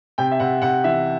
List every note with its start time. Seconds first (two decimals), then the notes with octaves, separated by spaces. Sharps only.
0.18 C3 G5
0.31 E5
0.40 C3 F#5
0.62 C3 F#5
0.84 E3 E5